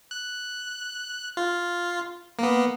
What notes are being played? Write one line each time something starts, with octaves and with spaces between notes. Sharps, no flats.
F#6
F4
A#3 B3